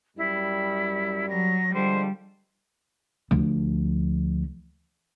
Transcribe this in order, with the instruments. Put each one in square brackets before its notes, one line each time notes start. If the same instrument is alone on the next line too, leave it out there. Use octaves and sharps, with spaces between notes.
[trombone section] F#2 G3 [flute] E4
[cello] F#3 [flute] A#6
[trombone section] D3 F3 G#3 [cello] G3 [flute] C5
[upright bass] D2 F3